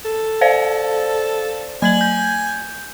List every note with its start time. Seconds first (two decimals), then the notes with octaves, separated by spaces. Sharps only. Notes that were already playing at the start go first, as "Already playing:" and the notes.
0.05 A4
0.41 C5 D5 F5
1.82 F#3 G#5 G#6 F#7
2.01 G6